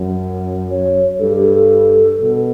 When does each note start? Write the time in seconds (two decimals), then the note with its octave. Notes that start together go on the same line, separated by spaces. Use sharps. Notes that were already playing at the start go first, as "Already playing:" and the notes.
Already playing: F#2
0.70 C#5
1.20 G2 A4
1.33 G4
1.44 A4
2.21 B2